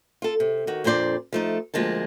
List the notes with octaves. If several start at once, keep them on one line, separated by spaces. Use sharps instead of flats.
F4 A4
C3
D#3 F#4
F2 A#2 D4 C5 D5
F3 A3 D#4
D2 F3 G#3 A#3 A5